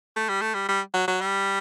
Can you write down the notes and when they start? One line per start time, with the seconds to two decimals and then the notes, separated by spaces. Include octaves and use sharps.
0.16 A3
0.29 G3
0.42 A3
0.55 G3
0.69 G3
0.94 F#3
1.08 F#3
1.21 G3